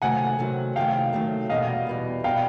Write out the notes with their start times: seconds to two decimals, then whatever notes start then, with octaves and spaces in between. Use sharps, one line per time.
0.02 C3 D#3 F#3 A3 F#5 G#5
0.39 C3 D#3 F#3 A3
0.76 C3 D#3 F#3 A3 F5 G5
1.13 C3 D#3 F#3 A3
1.49 E2 B2 G3 D#5 F5
1.87 E2 B2 G3
2.24 B2 G3 F5 G5